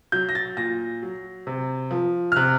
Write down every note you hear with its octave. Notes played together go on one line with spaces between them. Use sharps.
F#3 G6
A#6
A6
A#2 A#6
F#3
C3
F3
F6
C3 F#6